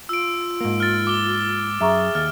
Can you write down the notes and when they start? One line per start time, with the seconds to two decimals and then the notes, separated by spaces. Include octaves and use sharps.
0.09 F4 E6 D7
0.61 G#2 A#3
0.80 F6 A6
1.07 D6 G7
1.81 F#2 G#4 E5 A#5 C#6
2.15 D#2 F6 A6